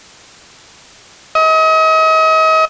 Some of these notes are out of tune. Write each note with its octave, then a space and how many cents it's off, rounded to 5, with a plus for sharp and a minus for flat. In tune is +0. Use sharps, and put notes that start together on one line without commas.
D#5 +40